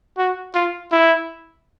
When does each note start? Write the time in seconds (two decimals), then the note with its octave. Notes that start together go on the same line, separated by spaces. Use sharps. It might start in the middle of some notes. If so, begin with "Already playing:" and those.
0.18 F#4
0.54 F4
0.92 E4